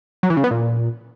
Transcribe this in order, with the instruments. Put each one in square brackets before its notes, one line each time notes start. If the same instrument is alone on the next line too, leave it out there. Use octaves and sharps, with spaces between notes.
[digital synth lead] F#3
E3
C#3
B3
A#2